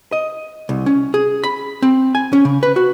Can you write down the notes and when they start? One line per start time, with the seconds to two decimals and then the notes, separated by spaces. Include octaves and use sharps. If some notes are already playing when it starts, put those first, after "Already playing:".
0.12 D#5
0.69 C2
0.86 C#4
1.14 G#4
1.44 B5
1.82 C4
2.15 G#5
2.33 C#4
2.45 C#3
2.63 B4
2.76 F#4